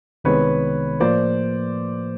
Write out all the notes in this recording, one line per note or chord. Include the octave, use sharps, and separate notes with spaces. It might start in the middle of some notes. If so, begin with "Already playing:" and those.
C2 C3 D#3 G#3 B3 B4 C#5
A2 F3 A#3 C5 D5